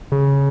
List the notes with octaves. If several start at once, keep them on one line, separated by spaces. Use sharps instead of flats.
C#3